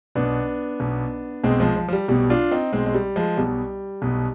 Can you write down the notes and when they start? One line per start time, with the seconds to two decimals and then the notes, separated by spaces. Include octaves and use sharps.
0.15 B1 B2 B3 D4
0.80 B1 B2
1.44 B1 B2 G#3 C4
1.60 F3 G#3
1.76 F3
1.88 F3
1.93 G3
2.08 B1 B2 G3
2.30 D4 F4
2.51 C4 D#4
2.73 B1 B2 G#3 C4
2.86 G#3
2.94 G3
3.16 F3 G#3
3.37 B1 B2 G3
4.02 B1 B2